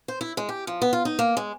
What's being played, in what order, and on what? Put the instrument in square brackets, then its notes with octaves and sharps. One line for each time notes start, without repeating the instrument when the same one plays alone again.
[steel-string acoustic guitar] C5
E4
G#3
G4
F3
B3
F4
D#4
A#3
G#3